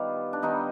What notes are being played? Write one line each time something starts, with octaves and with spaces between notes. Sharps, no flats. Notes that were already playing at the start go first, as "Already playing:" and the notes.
Already playing: D#3 G3 B3 F4 G4
D4
D#3 G3 B3 D#4